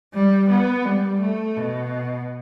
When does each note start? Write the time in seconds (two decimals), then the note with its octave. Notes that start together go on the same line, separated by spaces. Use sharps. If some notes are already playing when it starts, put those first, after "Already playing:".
0.14 G3
0.50 B3
0.85 G3
1.21 A3
1.57 B2